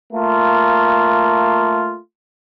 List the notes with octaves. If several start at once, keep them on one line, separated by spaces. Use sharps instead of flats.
A3 A#3 F4